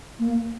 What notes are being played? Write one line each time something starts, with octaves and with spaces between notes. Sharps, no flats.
A#3